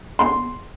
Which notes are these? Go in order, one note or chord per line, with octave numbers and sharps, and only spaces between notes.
C6